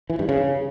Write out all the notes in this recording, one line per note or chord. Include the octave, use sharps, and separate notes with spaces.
E3
G2
C#3